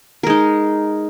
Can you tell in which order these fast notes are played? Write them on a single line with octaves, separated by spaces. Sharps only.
A#4 G#3 D#4